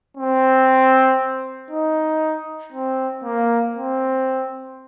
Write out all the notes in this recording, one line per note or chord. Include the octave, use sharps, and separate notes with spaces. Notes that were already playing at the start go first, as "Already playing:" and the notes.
C4
D#4
C4
A#3
C4